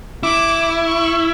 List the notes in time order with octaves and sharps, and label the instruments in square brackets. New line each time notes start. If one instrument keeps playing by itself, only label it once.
[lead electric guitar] E4 [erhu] D6
[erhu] C#6